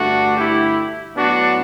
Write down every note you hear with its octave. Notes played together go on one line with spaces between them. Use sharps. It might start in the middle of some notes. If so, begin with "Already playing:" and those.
Already playing: G2 D3 A3 D4 F#4
E4 G4
A2 F#3 B3 D4 F#4